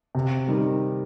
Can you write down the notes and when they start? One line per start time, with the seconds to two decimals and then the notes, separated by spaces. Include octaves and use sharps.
0.15 C3
0.48 D#3 G3